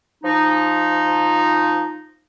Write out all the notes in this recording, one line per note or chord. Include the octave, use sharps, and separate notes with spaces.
F3 D#4